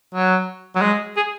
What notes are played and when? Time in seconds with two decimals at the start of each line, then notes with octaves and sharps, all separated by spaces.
0.14 F#3
0.75 F#3
0.82 G#3
1.16 G#4